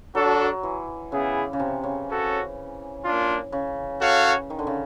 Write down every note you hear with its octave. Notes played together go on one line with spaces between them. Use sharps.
F#3 D4 F#4 A4
E3
C#3 B3 E4 G#4
C#3
C3
C#3
C#4 F#4 A4
A#3 D4 F4
C#3
F#4 A4 C#5 F5
D#3
D3
C#3